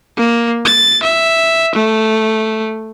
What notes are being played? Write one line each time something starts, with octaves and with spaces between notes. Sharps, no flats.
A#3
A6
E5
A3